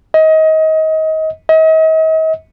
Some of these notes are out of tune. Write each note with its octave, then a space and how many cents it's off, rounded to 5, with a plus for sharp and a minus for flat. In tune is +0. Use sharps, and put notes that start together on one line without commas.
D#5 +25
D#5 +40